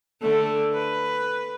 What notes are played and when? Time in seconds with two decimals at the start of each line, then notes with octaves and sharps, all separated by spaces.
0.22 D3 A3
0.74 B4